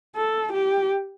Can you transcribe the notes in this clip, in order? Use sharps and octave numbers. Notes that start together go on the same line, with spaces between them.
A4
G4